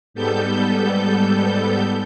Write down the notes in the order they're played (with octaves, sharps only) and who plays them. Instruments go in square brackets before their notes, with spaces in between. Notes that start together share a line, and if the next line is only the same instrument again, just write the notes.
[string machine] G#2 G3 B3 A4 G6